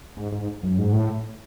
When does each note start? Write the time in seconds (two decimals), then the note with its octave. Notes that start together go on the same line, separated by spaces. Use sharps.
0.17 G#2
0.32 G#2
0.63 F#2
0.79 G#2
0.93 A2